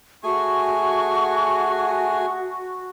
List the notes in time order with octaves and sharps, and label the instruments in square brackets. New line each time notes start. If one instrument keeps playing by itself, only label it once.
[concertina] A3 G#4 G#5 [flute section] F#4 [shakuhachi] C#6